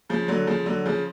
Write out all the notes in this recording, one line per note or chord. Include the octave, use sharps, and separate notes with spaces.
C#3 F3
D3 F#3
C#3 F3
D3 F#3
C#3 F3